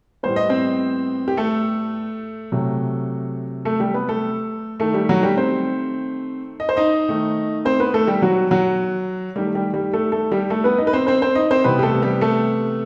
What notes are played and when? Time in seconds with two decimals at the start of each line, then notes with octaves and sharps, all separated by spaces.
0.23 A2 G3 B3 C5
0.36 D#5
0.50 C4 C5
1.28 G4
1.37 A3 A4
2.52 C3 F#3 A3
3.65 A3 A4
3.80 G3 G4
3.94 B3 B4
4.08 A3 A4
4.80 D#3 A3 A4
4.94 G3 G4
5.09 F#3 F#4
5.23 G3 G4
5.37 C4 C5
6.60 D#5
6.69 C5
6.77 D#4 D#5
7.09 D#3 A3
7.65 C4 C5
7.80 B3 B4
7.94 A3 A4
8.07 G3 G4
8.22 F#3 F#4
8.51 F#3 F#4
9.36 D#3 G3 A3 G4
9.55 G3 G4
9.74 G3 G4
9.93 A3 A4
10.12 A3 A4
10.32 G3 G4
10.50 A3 A4
10.64 B3 B4
10.78 D#4 D#5
10.87 B4
10.93 C4 C5
11.07 C4 C5
11.22 C4 C5
11.35 D#4 D#5
11.51 C4 C5
11.64 C3 E3 G3 B3 B4
11.79 G4
11.83 A3 A4
12.02 G3 G4
12.21 A3 A4